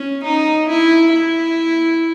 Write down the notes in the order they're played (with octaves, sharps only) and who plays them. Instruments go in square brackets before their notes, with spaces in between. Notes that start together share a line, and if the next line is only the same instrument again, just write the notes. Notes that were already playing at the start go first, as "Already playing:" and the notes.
Already playing: [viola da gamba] C#4
D#4
E4
E4